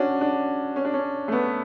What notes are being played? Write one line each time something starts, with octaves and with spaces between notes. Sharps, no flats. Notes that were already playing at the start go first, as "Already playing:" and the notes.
Already playing: C#4 D4 F#4
D4
C#4
D4
C#4
A3
B3